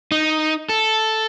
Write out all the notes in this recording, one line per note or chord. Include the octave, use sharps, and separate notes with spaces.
D#4
A4